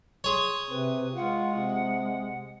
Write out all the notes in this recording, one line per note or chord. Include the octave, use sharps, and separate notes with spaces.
G#4 C#5 C6
C3 C4 B4
G#3 F4 F#5
C3